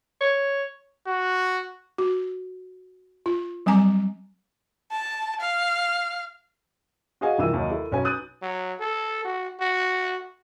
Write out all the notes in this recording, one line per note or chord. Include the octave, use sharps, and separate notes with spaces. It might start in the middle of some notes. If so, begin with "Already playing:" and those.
C#5
F#4
F#4
F4
F#3 G3 C4 G#5 A#5 D6
A5
F5
F#4 G#4 D#5 F5 F#5 G#5
C2 D#3 E3 F4 E6 D#7
D#2 F#3 A#4 D#5
E4 A4
B1 C#4 B4 G#5
D#6 F#6 G6 A6 D#7
F#3
A4
F#4
F#4